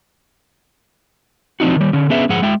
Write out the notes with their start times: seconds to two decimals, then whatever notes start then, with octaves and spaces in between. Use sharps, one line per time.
1.60 F3 C4 D4 D#4 F#4
1.76 D#3 G3
1.93 D3 C#4
2.10 D3 B3 C#4 G#4 B4 E5
2.29 G#2 F3 G#4 F#5
2.42 G#3 E5 G5